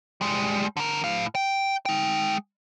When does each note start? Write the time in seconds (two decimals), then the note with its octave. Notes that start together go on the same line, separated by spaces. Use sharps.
0.21 G3 G#3
0.77 D3 A#4
1.04 A2 F5
1.35 G5
1.86 G#3 G5